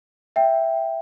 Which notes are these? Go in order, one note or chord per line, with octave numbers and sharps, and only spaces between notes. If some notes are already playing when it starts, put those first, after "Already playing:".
E5 G5